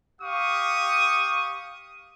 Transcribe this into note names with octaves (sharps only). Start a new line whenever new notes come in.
G4 F5 C#6 D#6